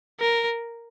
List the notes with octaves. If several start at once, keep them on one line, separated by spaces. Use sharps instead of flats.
A#4